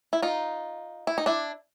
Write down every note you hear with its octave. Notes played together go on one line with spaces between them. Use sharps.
E4
D#4 F4
E4
D#4
D4 E4